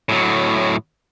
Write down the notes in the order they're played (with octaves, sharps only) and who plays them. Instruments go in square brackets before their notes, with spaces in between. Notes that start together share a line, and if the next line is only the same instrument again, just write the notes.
[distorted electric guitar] A2 F#3